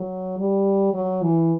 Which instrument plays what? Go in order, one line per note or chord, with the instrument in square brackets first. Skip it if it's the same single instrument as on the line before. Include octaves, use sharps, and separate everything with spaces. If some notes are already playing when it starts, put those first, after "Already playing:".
Already playing: [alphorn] F#3
G3
F#3
E3